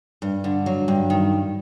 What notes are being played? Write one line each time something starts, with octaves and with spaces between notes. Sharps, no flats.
G2
D3
F#3
G2
D#3